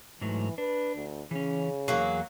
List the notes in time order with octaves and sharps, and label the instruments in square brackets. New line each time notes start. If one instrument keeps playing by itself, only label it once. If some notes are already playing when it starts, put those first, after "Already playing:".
[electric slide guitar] G#2 F#3 A3 [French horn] E3
[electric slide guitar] D4 [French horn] B4
[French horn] D2
[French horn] C#3 [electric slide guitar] E3 C#4
[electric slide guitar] E2 G#4 [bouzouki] F#3 A#3